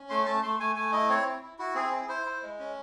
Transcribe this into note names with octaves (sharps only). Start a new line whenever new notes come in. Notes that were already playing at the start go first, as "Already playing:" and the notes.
Already playing: C#4
A3 C6
A3 A5
A3 C6
A3 G#5
A3 G#5
E4 D#5
C4 C#5
E4
E4
E4 F#4
C4 G#4
E4
E4 C5
E4
G#3
C#4